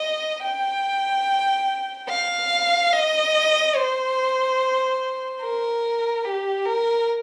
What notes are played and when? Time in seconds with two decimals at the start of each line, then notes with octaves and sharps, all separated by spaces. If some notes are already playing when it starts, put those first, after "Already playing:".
Already playing: D#5
0.44 G5
2.09 F5
2.93 D#5
3.76 C5
5.42 A#4
6.25 G4
6.66 A#4